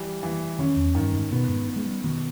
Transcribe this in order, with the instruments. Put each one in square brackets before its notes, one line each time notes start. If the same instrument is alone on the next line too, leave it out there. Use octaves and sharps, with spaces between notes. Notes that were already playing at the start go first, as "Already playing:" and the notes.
Already playing: [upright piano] E3 G3
E3
[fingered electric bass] D#3 [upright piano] C#4
[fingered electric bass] E2
[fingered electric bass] G2 [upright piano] D#3
[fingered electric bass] G#2
[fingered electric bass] B2 [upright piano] B3
[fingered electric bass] G#2
[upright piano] B3
[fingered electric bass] G#3
G3
[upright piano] B2 [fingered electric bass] D#3